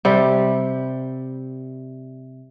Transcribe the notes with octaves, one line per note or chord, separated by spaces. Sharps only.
C3 G3